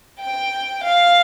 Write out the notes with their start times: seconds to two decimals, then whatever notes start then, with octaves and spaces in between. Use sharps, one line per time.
0.20 G5
0.83 F5